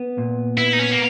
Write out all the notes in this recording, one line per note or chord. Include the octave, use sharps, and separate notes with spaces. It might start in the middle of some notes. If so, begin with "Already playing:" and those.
Already playing: B3
A#2
B3 E4
D#4
C#4
A#3